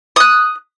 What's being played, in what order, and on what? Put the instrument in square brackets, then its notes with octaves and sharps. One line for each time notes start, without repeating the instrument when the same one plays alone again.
[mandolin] D#6 F#6